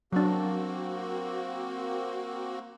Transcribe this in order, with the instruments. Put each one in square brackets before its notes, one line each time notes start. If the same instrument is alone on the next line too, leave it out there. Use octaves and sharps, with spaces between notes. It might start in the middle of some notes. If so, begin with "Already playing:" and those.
[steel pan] F#3 D4 [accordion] A#3 C4 F#4